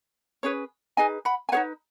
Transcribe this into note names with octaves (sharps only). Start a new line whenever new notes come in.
C#4 G#4 B4 C#5
D#4 G#4 B4 D#5 G#5
F#5 B5
G#5
D#4 G#4 B4 C#5 F#5